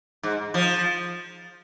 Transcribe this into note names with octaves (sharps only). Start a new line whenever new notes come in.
G#2
F3